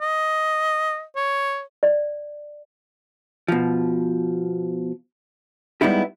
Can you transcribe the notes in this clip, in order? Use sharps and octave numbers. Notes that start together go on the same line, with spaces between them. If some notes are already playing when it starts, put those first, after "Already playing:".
D#5
C#5
D5
B2 F3
G3 G#3 B3 D#4 E4 G4